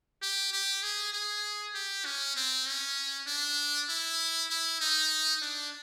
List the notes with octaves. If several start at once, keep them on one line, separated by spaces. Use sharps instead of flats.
G4
G4
G#4
G#4
G4
C#4
C4
C#4
D4
E4
E4
D#4
D4